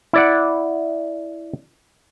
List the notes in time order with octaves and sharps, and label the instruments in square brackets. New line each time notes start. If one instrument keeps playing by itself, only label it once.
[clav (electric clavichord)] E4 D5 F#5